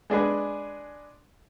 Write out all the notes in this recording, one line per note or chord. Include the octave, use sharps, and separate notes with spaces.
G#3 D4 G#4 B4